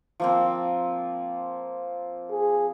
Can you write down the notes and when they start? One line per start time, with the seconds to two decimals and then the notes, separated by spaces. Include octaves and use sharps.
0.20 F3 A#3 C4
2.31 G#4